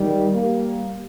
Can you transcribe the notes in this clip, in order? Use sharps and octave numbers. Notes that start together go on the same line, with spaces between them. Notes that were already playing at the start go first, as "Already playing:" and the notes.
Already playing: D#3 G3
G3 A#3